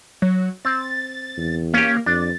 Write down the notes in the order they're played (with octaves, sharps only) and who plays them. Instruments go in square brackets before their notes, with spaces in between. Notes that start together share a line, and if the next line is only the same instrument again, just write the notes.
[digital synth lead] F#3
[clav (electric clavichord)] C4 [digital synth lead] A6
[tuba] E2
[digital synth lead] A#3 [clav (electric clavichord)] C#4 G4
[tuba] F2 [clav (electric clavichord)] D4 [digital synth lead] A6